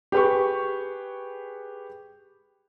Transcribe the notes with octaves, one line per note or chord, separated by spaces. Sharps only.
G4 G#4 B4 B5 C#6